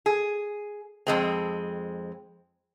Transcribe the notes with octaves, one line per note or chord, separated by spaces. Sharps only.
G#4
F2 G#3 C4